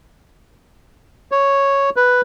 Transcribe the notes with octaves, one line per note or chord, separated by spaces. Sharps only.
C#5
B4